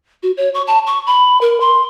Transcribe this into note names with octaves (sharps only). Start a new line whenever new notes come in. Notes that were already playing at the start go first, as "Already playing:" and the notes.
F#4
C#5
C#6
A5
C#6
B5
A#4
C6